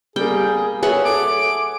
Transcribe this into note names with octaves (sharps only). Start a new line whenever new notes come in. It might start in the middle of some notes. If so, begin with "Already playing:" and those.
G3 A#3 G#4 G5
G#4 B4 C#5 E5 F#5
A4 D6